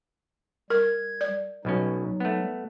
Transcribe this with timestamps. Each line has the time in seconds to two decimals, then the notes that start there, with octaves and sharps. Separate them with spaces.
0.70 G3 A#4 G#6
1.21 D5
1.65 B1 B2 F#3 G3 C#4 D#4
2.20 A3 B3